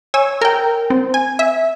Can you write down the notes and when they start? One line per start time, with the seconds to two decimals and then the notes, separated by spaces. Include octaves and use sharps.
0.14 C#5 G#5 E6
0.41 A#4 G5
0.90 C4
1.14 G#5
1.39 E5